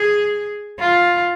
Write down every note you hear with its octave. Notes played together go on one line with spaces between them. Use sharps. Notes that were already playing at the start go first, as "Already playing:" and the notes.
Already playing: G#4
F4